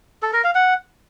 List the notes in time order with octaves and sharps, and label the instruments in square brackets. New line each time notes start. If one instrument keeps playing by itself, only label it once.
[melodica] A4
A#4
F5
F#5